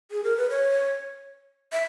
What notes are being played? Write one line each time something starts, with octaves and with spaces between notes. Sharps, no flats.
G#4
A#4
B4
C#5
E5